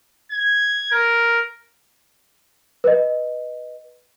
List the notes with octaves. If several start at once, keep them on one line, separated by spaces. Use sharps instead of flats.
G#6
A#4
B4 D#5